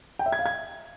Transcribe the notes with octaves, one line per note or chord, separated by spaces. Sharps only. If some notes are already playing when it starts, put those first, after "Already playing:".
G5
E5
G#6
F5
G#6